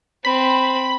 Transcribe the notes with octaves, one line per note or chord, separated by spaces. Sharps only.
C4 B5